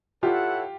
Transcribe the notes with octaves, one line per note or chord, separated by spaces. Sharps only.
E4 F4 G4 A4 C#5 F#5